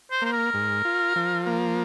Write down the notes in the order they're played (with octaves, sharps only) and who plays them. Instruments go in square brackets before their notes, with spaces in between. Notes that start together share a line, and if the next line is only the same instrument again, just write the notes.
[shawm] C5
[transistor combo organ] A#3 [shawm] C5
[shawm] A#4
[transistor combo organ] G#2
F4
F3
A#3